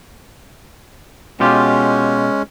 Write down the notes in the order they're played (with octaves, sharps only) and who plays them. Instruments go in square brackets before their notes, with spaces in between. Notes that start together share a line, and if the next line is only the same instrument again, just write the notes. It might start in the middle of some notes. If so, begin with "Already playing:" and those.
[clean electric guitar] B2 F4 G4 [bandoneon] G#3 C#4